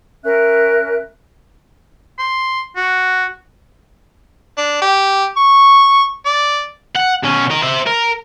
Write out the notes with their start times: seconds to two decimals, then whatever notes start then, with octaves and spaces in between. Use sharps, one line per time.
0.23 C#4 A#4 E5 F#6
2.19 C6
2.76 F#4
4.57 D4
4.82 G4
5.37 C#6
6.26 D5
6.96 F#5
7.24 B2 C#4
7.51 A#4 D#5
7.63 C5 E5
7.86 A#4